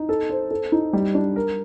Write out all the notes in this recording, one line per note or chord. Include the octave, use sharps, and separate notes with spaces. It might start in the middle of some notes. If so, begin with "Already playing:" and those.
Already playing: D#4
A4
C5
A4
D#4
G3
D4
A#4